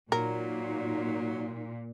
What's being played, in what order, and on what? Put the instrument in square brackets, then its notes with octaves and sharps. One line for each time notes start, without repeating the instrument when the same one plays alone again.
[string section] A#2 [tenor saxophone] F#3 [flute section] D#4 [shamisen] A#4